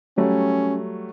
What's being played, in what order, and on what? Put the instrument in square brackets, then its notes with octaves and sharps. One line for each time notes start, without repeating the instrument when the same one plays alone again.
[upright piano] F#3 G3 A3 [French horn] C#4